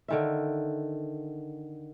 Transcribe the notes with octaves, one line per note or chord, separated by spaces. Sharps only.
D3 D#3 E5